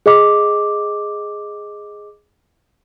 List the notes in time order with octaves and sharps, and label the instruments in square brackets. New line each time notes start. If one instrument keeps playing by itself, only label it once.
[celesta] G#4 D#5 D6